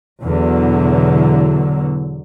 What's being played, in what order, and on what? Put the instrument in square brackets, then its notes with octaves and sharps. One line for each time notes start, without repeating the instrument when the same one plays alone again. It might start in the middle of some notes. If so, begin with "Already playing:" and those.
[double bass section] E2 B2 D3 F#3